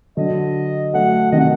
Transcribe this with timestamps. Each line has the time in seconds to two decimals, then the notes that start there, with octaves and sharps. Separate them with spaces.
0.17 D3 F#3 D#5
0.94 F#3 A3 F#5
1.32 C3 D#3 D#5
1.40 F#5